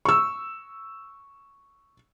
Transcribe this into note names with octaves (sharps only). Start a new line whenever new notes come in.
C#6 E6